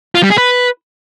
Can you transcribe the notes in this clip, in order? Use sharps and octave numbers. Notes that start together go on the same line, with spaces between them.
F4
G3
G#4
B4